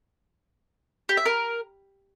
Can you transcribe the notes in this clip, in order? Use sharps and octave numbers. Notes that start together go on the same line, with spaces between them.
G4
E5
A#4